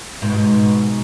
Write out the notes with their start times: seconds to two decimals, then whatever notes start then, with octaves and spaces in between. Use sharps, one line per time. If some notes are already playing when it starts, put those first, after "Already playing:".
0.22 G#2 B2